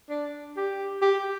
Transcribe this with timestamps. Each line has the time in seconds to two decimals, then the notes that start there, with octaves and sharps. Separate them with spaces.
0.10 D4
0.57 G4
1.02 G4